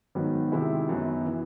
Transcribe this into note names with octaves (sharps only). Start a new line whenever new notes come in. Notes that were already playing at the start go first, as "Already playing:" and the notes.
G#2 D#3 F#3 B3
C3 D#3 G#3 C4 E4
F#2 D#3 F#3 B3
E3